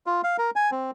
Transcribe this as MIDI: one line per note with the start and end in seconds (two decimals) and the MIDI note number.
0.06 0.21 65
0.24 0.37 77
0.38 0.50 70
0.56 0.71 80
0.72 0.91 60